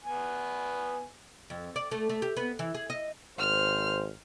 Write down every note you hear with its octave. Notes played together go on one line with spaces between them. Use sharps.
B3 G#5
F2
D5
A3
A3
G4
B3
E3
G#4
D#5
G#1 C5 F6